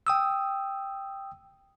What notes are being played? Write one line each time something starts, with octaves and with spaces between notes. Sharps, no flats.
G5 D#6 E6